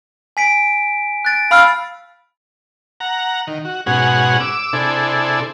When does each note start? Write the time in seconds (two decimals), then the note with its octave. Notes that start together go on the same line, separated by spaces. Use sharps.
0.37 G#5 B6 D7
1.25 F#6 A6 D7
1.51 F5 B5 E6 A6
3.00 F#5 A#5
3.47 D#3
3.65 F#4
3.86 G#2 B2 C#4 F#4 G#4 F#5
4.40 D6 E6
4.73 C3 D4 E4 G#4 A4